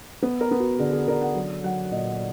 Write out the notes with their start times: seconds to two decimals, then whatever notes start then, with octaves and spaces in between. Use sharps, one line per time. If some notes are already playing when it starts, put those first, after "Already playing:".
0.22 B3 B4
0.41 A#4
0.51 B3
0.60 F#4
0.79 D3 G#4
0.93 G#4
1.07 D3 A#4
1.22 F#5
1.35 F#3
1.64 F#3 F#5
1.91 A#2 D#5